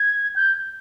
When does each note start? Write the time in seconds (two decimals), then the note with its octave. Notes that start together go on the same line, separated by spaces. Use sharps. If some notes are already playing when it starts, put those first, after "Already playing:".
Already playing: G#6
0.36 G6